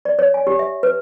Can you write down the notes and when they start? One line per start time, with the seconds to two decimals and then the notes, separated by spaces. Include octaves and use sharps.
0.05 D5
0.19 C#5
0.34 G#5
0.47 G4
0.59 E5
0.83 B4